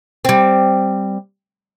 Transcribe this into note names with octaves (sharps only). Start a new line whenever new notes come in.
G3 C4